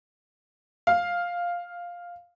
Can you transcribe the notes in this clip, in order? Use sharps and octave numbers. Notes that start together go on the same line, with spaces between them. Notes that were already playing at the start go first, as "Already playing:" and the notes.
F5